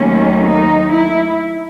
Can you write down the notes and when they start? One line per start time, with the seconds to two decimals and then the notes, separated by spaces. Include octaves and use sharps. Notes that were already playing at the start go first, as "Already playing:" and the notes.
Already playing: D#2 D#3 F#3 A3 C#4
0.45 D#4
0.92 E4